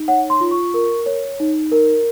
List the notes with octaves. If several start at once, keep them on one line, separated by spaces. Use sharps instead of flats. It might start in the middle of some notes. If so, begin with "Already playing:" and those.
Already playing: D#4
C#5 F#5
C6
F4
C#6
A#4
C#5
D#4
A#4